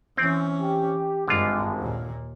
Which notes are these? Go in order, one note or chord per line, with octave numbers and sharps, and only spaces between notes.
E3 C4 C#4
G4
G#1 G2 D3 G#3 F4
D#2 A#2